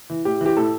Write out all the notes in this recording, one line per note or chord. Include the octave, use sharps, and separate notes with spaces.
E3
A2 G4
E3 G4
A2 A4